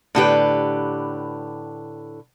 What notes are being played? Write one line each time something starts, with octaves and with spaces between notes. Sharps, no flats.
A2 D3 G4 B4